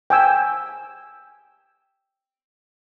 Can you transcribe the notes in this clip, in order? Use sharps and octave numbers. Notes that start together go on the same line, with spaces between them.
G5 G#5 E6